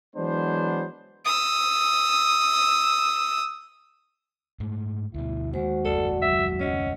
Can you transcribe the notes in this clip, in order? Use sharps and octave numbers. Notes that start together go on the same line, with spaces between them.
E3 F#3 G#3 B3 D4 C5
D#6 E6
G#2 A3
D2 B2 E4
D#2 G#3 F#4 C5
F#1 D#2 G#3 A4 D5 A5
F#3 E5
C#4 C#5 D#5 F#5